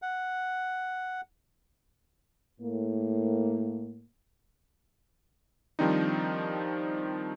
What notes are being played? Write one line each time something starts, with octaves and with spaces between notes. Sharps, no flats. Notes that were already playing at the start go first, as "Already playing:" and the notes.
F#5
A2 A#3
D#3 F3 G3 C4 D4 D#4